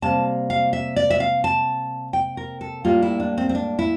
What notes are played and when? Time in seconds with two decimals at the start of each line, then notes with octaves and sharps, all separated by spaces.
0.02 C3 G3 A#3 A5
0.50 F5
0.73 E5
0.96 D5
1.10 E5
1.20 F5
1.44 A5
2.13 G5
2.37 A#4
2.61 A4
2.85 A2 G3 A#3 F4
3.02 E4
3.20 D4
3.38 C4
3.49 C4
3.55 D4
3.79 E4